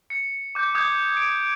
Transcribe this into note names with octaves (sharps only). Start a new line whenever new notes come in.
C#7
D6 G6
D#6 G6 G#6
D7